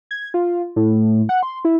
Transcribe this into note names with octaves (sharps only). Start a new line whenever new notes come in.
G#6
F4
A2
F#5
C6
E4